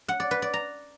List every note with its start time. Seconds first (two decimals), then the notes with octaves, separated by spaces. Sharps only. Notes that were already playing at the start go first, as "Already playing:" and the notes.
0.08 F#5
0.20 D5
0.31 B4
0.42 D5
0.54 A#5